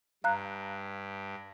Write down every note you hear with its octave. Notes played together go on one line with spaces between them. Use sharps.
G2 F5 A#5 F#6